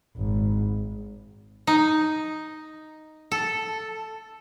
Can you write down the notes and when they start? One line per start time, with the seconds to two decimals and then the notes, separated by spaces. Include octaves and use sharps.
0.17 G#1
1.67 D#4
3.32 A4